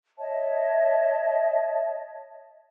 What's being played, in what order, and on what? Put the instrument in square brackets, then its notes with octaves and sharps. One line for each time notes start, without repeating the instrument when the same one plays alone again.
[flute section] C#5 D#5 E5 A5